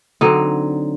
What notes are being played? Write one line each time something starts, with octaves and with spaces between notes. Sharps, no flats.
D3 F#3 C4 D#4